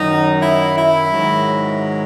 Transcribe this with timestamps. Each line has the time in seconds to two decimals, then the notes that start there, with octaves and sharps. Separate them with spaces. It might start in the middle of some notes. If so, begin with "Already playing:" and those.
Already playing: F#2 D#3 F#3 D#4
0.41 E4
0.75 E4
1.10 G#2 D#3 F#3